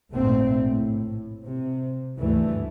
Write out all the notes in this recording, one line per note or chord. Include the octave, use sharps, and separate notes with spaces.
F1 A#1 G#2 A3 C4
A2
C3
D2 G2 E3 A3